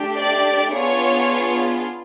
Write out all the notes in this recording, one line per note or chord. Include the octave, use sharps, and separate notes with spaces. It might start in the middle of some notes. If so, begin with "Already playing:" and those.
Already playing: A3 D4 G4
D5
B3 D4 F4 G#4 C#5